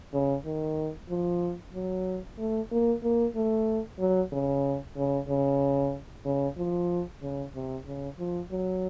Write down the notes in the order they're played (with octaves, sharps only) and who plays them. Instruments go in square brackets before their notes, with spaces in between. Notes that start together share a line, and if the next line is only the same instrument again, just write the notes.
[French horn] C#3
D#3
F3
F#3
A3
A#3
A#3
A3
F#3
C#3
C#3
C#3
C#3
F3
C#3
C3
C#3
F3
F#3